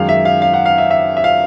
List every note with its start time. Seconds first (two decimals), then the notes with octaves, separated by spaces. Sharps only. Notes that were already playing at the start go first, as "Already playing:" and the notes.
Already playing: F#2 D#3 G#3 F5
0.09 E5
0.25 F5
0.42 F5
0.54 F#5
0.66 F5
0.78 E5
0.91 E5
1.17 E5
1.24 F5